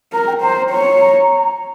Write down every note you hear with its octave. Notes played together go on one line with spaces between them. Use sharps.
A#4 A#5
G5
C5 A#5
C#5 A#5
A#5